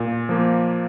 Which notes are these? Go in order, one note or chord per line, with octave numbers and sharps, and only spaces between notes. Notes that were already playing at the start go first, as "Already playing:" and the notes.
Already playing: A#2
F3 A#3